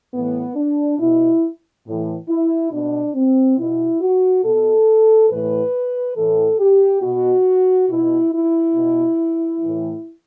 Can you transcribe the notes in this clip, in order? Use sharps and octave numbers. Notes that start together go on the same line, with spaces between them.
A2 E3 B3
D4
B2 E4
A2 E3
E4
B2 D4
C4
B2 E4
F#4
B2 A4
A2 E3 B4
A2 E3 A4
G4
B2 F#4
B2 E4
E4
B2
A2 E3